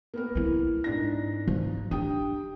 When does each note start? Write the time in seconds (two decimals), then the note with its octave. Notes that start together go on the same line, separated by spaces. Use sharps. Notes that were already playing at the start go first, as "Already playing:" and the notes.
0.14 A#3 B3 A#4
0.35 C4 E4
0.84 G#2 D4 A#6
1.47 F3
1.91 D4 G4 G5 D#6